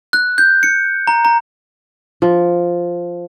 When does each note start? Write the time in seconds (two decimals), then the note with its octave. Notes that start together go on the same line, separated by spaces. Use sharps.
0.13 F#6
0.38 G6
0.63 C#7
1.07 A#5
1.25 A#5
2.22 F3